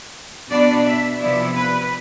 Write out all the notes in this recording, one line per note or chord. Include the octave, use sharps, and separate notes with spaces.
B2 B3 D4 D5
E5
C3 F3 B3 E4 D5
B4